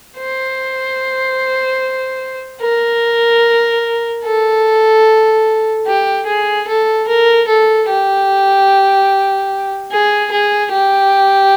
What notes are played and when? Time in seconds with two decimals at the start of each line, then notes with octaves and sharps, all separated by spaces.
0.18 C5
2.61 A#4
4.24 A4
5.87 G4
6.26 G#4
6.68 A4
7.08 A#4
7.48 A4
7.89 G4
9.92 G#4
10.31 G#4
10.72 G4